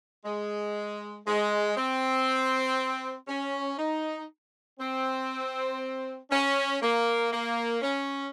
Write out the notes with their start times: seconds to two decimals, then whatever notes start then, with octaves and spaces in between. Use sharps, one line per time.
0.25 G#3
1.27 G#3
1.77 C4
3.28 C#4
3.78 D#4
4.79 C4
6.31 C#4
6.82 A#3
7.32 A#3
7.82 C#4